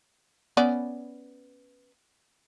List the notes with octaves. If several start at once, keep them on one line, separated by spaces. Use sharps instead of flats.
B3 C#4 D5